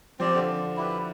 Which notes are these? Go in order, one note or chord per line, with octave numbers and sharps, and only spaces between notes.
F3 C4 G4 D5
D3
E4 G4 B4